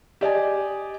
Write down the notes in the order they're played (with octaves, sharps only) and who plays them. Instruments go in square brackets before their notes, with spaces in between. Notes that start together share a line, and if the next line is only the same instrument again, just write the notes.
[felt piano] G4 D5 D#5 G#5